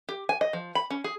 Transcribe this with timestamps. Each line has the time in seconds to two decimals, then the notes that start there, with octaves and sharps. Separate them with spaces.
0.09 G4
0.29 G#5
0.41 D#5
0.53 F3
0.75 B5
0.90 C#4
1.04 G#4